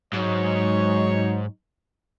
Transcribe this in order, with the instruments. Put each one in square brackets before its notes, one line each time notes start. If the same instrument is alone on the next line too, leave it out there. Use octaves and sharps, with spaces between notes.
[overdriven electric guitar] G#2 [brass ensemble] F#3 D#4 C#5